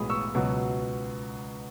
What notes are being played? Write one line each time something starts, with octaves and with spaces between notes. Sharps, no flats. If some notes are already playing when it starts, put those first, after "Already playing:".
Already playing: B1 A2 E3 G#3 B3 B5 D#6
C#6 E6
C#2 B2 F#3